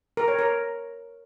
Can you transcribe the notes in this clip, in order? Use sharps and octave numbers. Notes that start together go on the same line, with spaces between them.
A#4
C#5
A#4